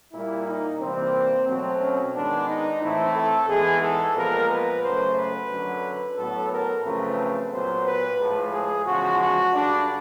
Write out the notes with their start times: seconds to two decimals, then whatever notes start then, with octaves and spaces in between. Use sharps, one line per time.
0.13 A#2 G3 A#3 E4
0.47 D#4
0.80 C3 E3 G3 A#3 C4
1.47 B2 F#3 A3 C4
1.81 C#4
2.14 G#2 D#3 G#3 B3 D4
2.48 D#4
2.81 A2 E3 A3 C4 E4
3.15 A4
3.48 G#2 E3 G#3 B3 G#4
3.83 A4
4.16 A#2 F3 G#3 B3 A#4
4.49 B4
4.83 F#2 C#3 F#3 A3 C5
5.16 B4
5.50 F#2 D3 F#3
6.17 A2 F#3 B3 A4
6.52 A#4
6.84 F#2 C#3 F3 A3 C4 B4
7.51 A#2 F#3 B3 C5
7.86 B4
8.19 A2 F3 G#3
8.53 G#4
8.86 E2 C#3 F3 G#3 F#4
9.20 F#4
9.54 G2 D3 G3 D4